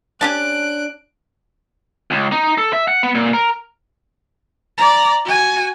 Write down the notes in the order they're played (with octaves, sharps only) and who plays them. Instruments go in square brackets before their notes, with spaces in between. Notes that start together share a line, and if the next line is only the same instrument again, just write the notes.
[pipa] C#4 G4 A5 [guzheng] D4 [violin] F#6 D7
[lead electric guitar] C#2
D#4
A4
E5
F#5
B3
A#2
A#4
[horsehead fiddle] D5 A#5
F#4 G#5